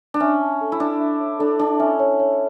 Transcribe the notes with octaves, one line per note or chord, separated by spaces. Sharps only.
D4
C#4 E5
A5
A4
E4
D4 A5
E5
C#5
D4 A4
D4 A5
C#4 E5
C#5
C#5